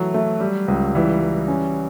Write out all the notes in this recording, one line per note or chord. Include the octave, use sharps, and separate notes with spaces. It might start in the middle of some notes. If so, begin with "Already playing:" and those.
Already playing: E3 F#3 A3
A3
G3
C#2
E3 G3
G3
C#4